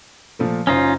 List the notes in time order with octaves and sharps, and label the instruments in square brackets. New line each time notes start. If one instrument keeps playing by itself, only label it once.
[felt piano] A#2 F3 A3
[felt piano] F#1 C5 D#6 [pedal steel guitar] C#4 D#4 F4